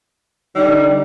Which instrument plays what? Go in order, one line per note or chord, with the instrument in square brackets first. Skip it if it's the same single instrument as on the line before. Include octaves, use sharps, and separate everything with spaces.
[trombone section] D3 D#4 [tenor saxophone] G3